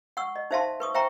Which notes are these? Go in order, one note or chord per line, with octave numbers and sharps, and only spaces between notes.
F#5 C#6 E6
D#5
D#4 C5 E5 F5 A5 C6
B4 C#6 D#6
C5 E5 G5 A#5 C#6